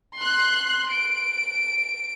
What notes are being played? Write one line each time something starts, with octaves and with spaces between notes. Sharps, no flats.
C6 F#6
D7